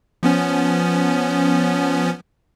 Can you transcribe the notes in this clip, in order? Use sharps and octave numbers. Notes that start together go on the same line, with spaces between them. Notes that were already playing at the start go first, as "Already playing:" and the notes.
F3 B3 C#4